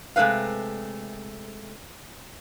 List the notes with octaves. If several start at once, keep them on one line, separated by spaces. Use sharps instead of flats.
C3 G#3 A3 C#4 B4 F5